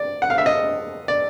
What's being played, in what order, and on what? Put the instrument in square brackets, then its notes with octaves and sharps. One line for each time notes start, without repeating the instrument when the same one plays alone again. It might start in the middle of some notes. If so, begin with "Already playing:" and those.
Already playing: [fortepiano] D5
F#5
F5
E5
D#5
D5